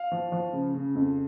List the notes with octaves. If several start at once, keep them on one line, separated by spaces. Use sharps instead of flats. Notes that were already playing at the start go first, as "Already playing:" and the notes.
Already playing: F5
F3
F3
C#3
C#3
F2